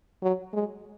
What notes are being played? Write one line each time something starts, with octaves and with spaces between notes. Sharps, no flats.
F#3
G#3